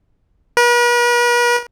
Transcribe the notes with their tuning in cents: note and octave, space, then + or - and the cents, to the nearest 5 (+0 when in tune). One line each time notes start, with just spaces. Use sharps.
B4 -45